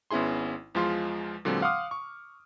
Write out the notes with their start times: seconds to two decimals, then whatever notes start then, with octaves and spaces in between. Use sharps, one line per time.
0.11 G#1 B3 C#4 E4 G#4 C6
0.75 E2 F3 G#3 F4 C6
1.45 A#2 D3 F#3 G#3 C4
1.62 F5 F#5 C6 D6 D#6 F6
1.91 C#6